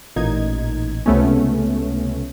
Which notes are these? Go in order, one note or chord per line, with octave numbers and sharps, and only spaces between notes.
A1 A#2 D#4 G#6
C#2 C3 A3 B3 C#4